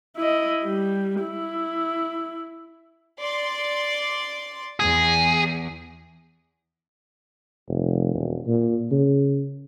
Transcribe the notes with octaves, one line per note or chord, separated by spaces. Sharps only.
E4 D#5
G3
E4
D5 C6
E2 G#4
F1
E1
A#2
C#3